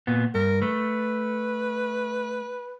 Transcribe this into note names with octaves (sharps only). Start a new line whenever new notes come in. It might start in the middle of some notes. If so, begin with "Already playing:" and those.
A#2 B3
G2 A#4
A3 B4